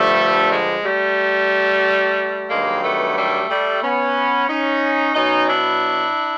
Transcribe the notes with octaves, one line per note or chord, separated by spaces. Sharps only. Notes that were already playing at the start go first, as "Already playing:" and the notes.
Already playing: G2 D3 F3 G3 A3
G#3
G3 A3
G2 D#3 F#3 G#3 A#3
A3 B3
G3 A3
G3 A3
B3 C#4
C#4 D#4
B2 F#3 C#4 D#4
D4 E4